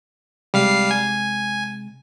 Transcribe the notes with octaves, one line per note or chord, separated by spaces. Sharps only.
C3 G3 G#3 F5 C7
G#5